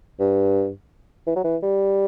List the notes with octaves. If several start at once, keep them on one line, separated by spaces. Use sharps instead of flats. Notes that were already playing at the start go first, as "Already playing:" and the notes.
G2
E3
F#3
E3
G3